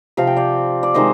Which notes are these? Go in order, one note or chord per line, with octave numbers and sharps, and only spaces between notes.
C3 F3 C4 F5
G5
D5 F5
D5
C3 D#3 G#3 C5 D#5